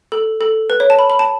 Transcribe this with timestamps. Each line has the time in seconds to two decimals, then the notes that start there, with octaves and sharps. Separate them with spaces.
0.12 A4
0.41 A4
0.70 B4
0.80 C#5
0.90 A5
0.99 B5
1.10 B5
1.19 A5